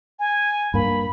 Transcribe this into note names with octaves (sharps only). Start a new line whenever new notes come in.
G#5
G2 A#3 B5